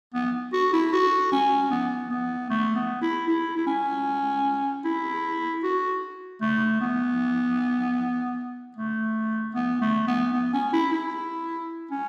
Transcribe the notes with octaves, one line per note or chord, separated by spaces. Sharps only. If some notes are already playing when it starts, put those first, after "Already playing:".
B3
F#4
E4
F#4
C#4
B3
B3
A3
B3
E4
E4
E4
C#4
E4
F#4
A3
B3
A3
B3
A3
B3
B3
C#4
E4
E4
C#4